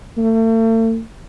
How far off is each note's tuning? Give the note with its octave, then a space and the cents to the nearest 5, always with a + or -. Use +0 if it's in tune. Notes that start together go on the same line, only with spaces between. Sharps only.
A3 +40